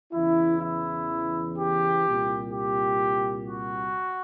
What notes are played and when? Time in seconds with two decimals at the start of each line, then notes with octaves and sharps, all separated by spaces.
0.13 E2 C#3 E3 E4
0.60 E4
1.57 G4
2.05 C2 A#2
2.52 G4
3.48 F#4